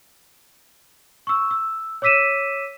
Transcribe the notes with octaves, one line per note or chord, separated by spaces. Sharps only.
C#6 E6
E6
C#5 D6 E6 B6 D#7 E7